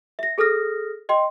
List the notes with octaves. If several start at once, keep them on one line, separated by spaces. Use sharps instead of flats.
E5 A#6
G#4 A4 D#6 F6 A#6
D#5 G5 C6